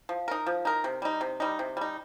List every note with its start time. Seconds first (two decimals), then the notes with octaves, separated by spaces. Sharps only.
0.09 F3
0.28 D#4 A#4
0.46 F3
0.65 D#4 A#4
0.84 C3
1.02 G3 D#4
1.21 C3
1.40 G3 D#4
1.59 C3
1.77 G3 D#4